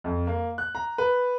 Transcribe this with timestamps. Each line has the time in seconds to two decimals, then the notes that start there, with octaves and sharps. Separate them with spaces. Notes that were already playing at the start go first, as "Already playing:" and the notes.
0.04 F2
0.27 A#3
0.58 F#6
0.75 A#5
0.98 B4